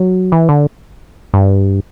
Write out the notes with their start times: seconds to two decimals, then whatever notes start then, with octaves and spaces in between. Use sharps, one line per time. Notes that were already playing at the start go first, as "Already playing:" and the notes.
Already playing: F#3
0.32 E3
0.49 D3
1.34 G2